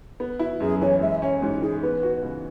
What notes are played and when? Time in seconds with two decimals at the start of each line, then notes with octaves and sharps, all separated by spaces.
0.20 B3
0.39 E4 F#4
0.60 F#2 G#4
0.81 E3 C#5
1.01 G#3 E5
1.22 C#4 C#5
1.42 G#2 F#4
1.62 E3 G#4
1.83 B3 B4
2.03 F#4
2.23 C#2